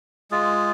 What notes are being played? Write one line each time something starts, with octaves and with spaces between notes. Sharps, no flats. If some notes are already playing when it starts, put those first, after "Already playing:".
G#3 F4 G#4